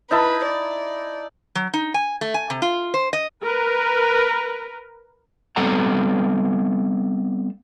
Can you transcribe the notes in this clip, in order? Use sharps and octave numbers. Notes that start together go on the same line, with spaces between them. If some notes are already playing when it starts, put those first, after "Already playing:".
D#4 E4 B4 A5
D5
F#3
D#4
G#5
A3
G#5
C3
F4
C5
D#5
A#4 B4
G3 B3 C4 A4 F#5 A#5